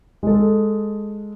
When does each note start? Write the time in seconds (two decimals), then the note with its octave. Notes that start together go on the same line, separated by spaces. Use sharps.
0.23 G#3 A4